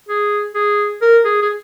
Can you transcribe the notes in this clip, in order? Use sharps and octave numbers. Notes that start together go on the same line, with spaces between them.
G#4
G#4
A#4
G#4
G#4